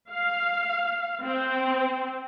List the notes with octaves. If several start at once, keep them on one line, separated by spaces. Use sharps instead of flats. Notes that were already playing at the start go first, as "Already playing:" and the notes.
F5
C4